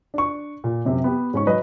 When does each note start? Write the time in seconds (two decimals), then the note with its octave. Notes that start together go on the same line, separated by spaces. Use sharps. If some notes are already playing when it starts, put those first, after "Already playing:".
0.14 D4 C#6
0.64 A#2
0.85 F#2 C3 G4
1.04 B3 G4
1.34 G#2 C#4 C#6
1.47 F#3 B4 D#5